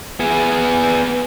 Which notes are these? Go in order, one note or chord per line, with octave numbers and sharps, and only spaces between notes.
B3 G#4